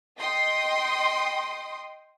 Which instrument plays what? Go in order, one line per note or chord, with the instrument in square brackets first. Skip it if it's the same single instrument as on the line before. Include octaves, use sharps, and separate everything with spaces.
[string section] D#5 G5 C6 D#6